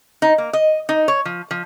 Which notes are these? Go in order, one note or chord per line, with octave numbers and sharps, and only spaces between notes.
D#4
A#3
D#5
D#4
C#5
F3
F3